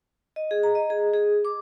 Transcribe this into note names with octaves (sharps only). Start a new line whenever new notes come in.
D#5
G#4
A#5
D#5
G#4
G#4
D6